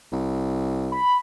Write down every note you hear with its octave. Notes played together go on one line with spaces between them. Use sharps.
C2
B5